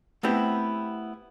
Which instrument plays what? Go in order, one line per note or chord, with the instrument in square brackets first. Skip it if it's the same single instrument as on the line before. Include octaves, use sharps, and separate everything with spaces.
[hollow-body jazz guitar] A3 B3 C4 E4 G4 B4